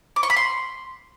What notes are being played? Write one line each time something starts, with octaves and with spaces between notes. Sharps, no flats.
D6
C#6
B5
C6